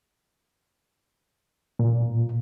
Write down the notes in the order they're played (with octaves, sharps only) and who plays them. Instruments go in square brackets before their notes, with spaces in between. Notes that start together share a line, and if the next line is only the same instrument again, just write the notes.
[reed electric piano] A#2